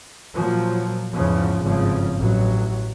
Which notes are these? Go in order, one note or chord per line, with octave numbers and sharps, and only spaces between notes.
A#2 F3 F#3
E2 G#2 C#3 F3
G#1 G2 C#3 F3
A1 F#3